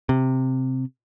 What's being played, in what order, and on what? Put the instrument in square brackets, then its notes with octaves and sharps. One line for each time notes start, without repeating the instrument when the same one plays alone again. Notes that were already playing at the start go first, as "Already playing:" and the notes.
[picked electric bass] C3